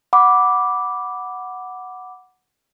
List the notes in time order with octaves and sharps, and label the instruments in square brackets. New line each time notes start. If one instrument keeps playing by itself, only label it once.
[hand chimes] F#5 B5 D6